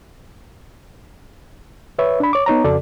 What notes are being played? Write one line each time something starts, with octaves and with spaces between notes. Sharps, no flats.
B4 C#5 E5
D4 B5
C#5 D6
B3 D#4 C#5 A#5
F2 C#3 F#4 A4 D5